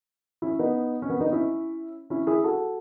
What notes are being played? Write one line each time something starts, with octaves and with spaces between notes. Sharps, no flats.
C#4 E4
B3 D#4
C#4
B3
B3 D#4
C#4 E4
C#4 E4
E4 G#4
F#4 A4